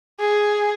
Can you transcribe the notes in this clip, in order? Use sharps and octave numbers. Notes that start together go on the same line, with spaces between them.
G#4